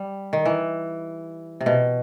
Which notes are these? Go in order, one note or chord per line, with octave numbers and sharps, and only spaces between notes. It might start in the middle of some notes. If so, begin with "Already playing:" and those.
Already playing: G3
D#3
E3
C3
B2